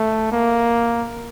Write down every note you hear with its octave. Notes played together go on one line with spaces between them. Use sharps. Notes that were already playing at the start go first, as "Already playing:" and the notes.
Already playing: A3
A#3